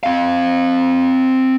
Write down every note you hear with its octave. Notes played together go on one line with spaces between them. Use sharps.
C4 F5